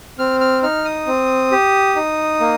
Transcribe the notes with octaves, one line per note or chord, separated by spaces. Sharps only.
C4 F6
F6
D#4 F6
D#6
C4
G4
D#4
A#3